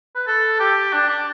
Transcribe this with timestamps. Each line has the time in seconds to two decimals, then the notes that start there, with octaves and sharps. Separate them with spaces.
0.15 B4
0.27 A4
0.60 G4
0.93 D4
1.08 D4